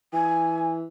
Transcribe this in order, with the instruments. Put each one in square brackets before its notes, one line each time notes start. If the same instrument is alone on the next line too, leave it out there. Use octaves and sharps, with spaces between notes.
[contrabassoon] E3 [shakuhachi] G#5